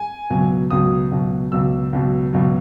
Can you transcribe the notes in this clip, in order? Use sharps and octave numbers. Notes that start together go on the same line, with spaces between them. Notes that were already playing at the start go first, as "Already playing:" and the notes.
Already playing: G#5
C#2 B2 F#3
C#2 B2 F#3 D#6
C#2 B2 F#3
C#2 B2 F#3 E6
C#2 B2 F#3
C#2 B2 F#3